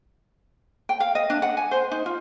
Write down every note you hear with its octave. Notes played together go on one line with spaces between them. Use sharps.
G5
F5
D#5
D4
F#5
G#5
C5
D#4
F4